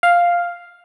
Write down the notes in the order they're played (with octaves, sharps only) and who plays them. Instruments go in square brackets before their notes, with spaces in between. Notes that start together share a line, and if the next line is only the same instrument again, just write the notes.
[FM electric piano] F5